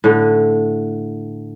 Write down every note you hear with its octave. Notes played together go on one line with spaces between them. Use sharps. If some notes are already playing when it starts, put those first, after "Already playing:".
A2 D3